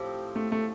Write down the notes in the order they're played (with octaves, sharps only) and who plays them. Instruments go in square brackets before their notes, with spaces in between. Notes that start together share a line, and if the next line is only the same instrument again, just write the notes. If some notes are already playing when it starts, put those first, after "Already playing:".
Already playing: [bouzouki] A2 F3 C4 G4
[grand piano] A3
A3